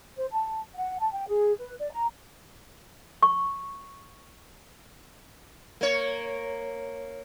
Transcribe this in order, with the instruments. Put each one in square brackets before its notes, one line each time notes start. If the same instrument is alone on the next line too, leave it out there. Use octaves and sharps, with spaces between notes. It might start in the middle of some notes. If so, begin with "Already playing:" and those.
[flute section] C5
A5
F#5
A5
G5
G#4
B4
D5
A#5
[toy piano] C#6
[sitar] A#3 C#5